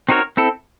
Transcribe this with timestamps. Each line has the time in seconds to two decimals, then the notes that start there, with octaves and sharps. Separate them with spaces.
0.09 C4 D#4 F#4 A#4 C#5
0.37 C4 E4 A4